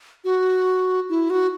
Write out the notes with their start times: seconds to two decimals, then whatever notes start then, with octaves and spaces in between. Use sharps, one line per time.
0.24 F#4
1.09 E4
1.30 F#4